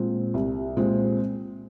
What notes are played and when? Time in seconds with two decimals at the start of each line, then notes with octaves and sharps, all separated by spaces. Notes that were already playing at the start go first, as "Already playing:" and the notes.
Already playing: A#2 G#3 C4
0.34 C2
0.77 A#2 G#3 C4